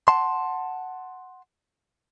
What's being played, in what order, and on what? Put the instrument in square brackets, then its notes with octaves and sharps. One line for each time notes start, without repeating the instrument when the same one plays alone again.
[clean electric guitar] F#5 A5 C6